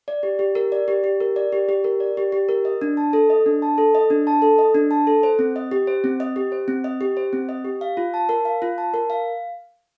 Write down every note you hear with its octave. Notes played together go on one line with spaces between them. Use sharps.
D5
G4
G4
A#4
D5
G4
G4
A#4
D5
G4
G4
A#4
D5
G4
G4
A#4
D#5
D4
A5
A4
D#5
D4
A5
A4
D#5
D4
A5
A4
D#5
D4
A5
A4
C5
C4
D#5
G4
C5
C4
D#5
G4
C5
C4
D#5
G4
C5
C4
D#5
G4
F5
F4
A5
A#4
F5
F4
A5
A#4
F5